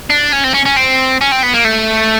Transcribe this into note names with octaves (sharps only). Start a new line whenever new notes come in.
D4
C#4
C4
C#4
C#4
C4
C#4
C4
B3
A#3
A3